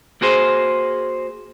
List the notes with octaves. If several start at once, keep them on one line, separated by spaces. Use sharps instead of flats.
A#3 F#4 G#4 C5